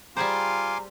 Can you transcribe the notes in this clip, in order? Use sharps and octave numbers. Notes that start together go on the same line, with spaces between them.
G3 F4 G#4 C5 G#5 A#5 C6 D6